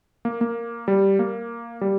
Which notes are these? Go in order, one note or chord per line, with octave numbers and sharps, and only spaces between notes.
A#3
A#3
G3
A#3
G3